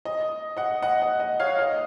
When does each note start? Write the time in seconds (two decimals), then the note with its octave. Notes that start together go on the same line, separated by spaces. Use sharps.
0.05 D#5
0.57 D#5 F#5
0.82 D#5 F#5
1.02 D#5
1.20 D#5
1.40 C#5 F5
1.59 D#5